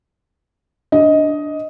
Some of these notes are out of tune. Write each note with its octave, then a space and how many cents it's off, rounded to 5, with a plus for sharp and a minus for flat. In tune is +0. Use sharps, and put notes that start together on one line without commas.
D4 +0 D#5 +10